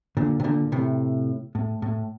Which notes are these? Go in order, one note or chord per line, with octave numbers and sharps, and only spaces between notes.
A#2 D3
C3
A#2 D3
A2 C3
A2
A2